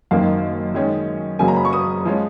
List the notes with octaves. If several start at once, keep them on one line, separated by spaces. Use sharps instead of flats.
F#1 F#2 D#3 A#3 F5
F#2 D#3 G#3 C#4
F#1 F#2 C#3 F#3 A#3 G#5
A#5
B5
C#6
D#6
F3 G#3 C#4